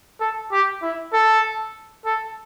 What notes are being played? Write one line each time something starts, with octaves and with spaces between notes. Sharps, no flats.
A4
G4
E4
A4
A4